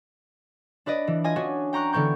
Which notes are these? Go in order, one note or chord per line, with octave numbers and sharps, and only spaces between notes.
D4 B4 D5 D#5
E3
F4 D#5 G#5 D#6
C#4 D4 F#4
G5 A#5 C#6 F#6
D3 E3 B3 C#6 G6